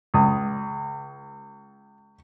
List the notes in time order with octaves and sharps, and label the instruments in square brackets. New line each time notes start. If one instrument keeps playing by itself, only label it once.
[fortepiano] C#2 D#6